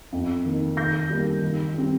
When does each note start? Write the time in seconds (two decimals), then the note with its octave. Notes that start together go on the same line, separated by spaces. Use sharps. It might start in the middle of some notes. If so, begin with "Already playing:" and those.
0.13 F2
0.45 D#3 A#3 D#4
0.77 D#3 G6 A#6
1.10 G3 A#3 D#4
1.42 D#3
1.74 G3 C4